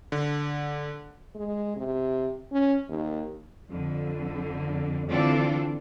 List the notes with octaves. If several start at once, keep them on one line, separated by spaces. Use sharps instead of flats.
D3
G#3
C3
C#4
D#2
F2 D3
D3 E3 C4 D4 F4 A4